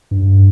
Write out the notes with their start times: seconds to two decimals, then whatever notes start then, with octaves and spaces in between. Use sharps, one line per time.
0.11 G2